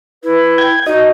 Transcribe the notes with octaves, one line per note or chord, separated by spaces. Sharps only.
E4 B4
G5 G#6
D#4 F#4 D#5